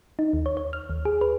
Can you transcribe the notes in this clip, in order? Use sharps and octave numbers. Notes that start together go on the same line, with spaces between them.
D#4
D#2
C#5
C#5
F6
D#2
G#4
B4